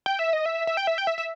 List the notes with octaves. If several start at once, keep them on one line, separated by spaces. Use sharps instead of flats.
G5
E5
D#5
E5
E5
G5
E5
G5
E5
E5